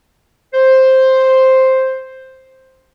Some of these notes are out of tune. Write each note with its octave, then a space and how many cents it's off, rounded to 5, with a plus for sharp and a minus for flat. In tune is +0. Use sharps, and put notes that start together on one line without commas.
C5 +5